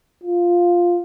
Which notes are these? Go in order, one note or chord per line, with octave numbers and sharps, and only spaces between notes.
F4